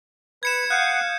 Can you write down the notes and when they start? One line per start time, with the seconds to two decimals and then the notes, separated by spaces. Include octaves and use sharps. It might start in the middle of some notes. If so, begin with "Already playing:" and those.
0.43 B4 G#6 C#7 E7
0.70 F5 F#5 D#6 F#6 G6